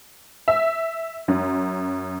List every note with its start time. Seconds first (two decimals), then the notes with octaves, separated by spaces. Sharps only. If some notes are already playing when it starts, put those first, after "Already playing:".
0.48 E5
1.28 F#2